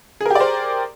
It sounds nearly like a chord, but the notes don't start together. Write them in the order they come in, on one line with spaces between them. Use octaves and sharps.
G#4 A#4 G4 D5 C5